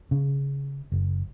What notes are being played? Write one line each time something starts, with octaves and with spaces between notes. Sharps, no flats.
C#3
F#1